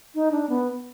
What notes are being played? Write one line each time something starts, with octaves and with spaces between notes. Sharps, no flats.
D#4
D4
B3